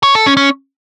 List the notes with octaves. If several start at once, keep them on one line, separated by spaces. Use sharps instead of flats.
C#5
A4
C#4
C#4